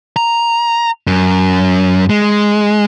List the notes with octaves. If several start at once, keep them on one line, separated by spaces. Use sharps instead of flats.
A#5
F#2
G#3